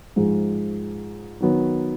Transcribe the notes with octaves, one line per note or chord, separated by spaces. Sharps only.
G#2 F3 G#3
D#3 F#3 B3